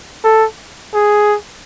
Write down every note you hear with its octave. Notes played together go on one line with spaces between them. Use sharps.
A4
G#4